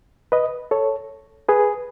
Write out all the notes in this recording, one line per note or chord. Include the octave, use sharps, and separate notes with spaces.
B4 D#5
A4 C#5
G#4 B4